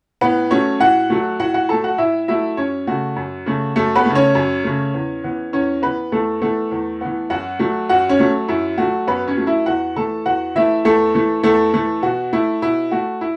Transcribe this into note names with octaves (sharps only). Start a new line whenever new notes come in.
A2 B3 B4
F#3 A3 C#4 C#5
A2 F#4 F#5
F#3 A3
A2 F#4 F#5
F#4 F#5
F#3 A3 A4 A5
F#4 F#5
A2 E4 E5
F#3 A3 E4 E5
F#2 C#4 C#5
C#3 A3 F#4
F#2
C#3 A3
F#2 A3 A4
B3 B4
C#3 A3
C#4 C#5
F#2
C#3 A3
E2
E3 B3
E2 C#4 C#5
E3 B3 B4
E2 A3 A4
E3 A3 B3 A4
E2
E3 B3
F#2 F#4 F#5
F#3 A3
F#2 F#4 F#5
C#4 C#5
F#3 A3
F#2 E4
A3 F#4
F#3
F#2 B3 B4
C#4 C#5
F#3 A3
E4 E5
E2 F#4 F#5
E3 A3 A4 A5
E2 F#4 F#5
E3 A3 E4 E5
E2 A3 A4
E3 A3
E2 A3 A4
E3 A3
B2 F#4
A3 E4
B2 E4
A3 F#4
E4